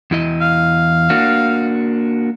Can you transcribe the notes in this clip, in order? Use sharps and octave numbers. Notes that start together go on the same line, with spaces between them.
E2 E4 D#5
F5
A#3 D4 F#4